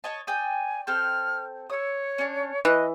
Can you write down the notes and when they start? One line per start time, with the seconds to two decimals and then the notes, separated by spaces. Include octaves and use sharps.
0.04 C#5 D#5 A5
0.27 D5 G5 G#5 D#6
0.87 C4 A4 G5 F6
1.70 C#5 D#6 E6
2.18 C#4 D4
2.65 E3 D#5 F#6